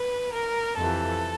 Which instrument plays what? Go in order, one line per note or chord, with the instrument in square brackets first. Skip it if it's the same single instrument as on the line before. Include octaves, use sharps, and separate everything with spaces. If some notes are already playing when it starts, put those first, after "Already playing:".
Already playing: [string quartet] B4
A#4
F2 C3 E3 A4